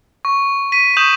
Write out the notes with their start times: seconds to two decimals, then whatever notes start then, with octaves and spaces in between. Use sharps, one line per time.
0.25 C#6
0.72 B6 D#7
0.97 C#6 D#6 G6 E7 F#7